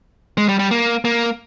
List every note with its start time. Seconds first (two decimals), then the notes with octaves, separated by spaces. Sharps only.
0.38 G#3
0.49 G3
0.59 G3
0.71 A#3
1.05 A#3